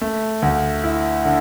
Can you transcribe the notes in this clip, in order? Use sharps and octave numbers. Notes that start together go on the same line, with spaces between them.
A3
D2
E4
D3